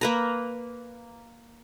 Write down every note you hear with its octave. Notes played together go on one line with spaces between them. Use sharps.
A#3 B4 A#5